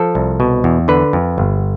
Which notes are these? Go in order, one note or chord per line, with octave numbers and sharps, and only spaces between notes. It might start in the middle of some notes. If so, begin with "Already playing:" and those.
Already playing: F3 A4
C2
B2
E2
D3 B4
F2
G1